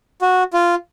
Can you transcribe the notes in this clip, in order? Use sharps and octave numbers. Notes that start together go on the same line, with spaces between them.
F#4
F4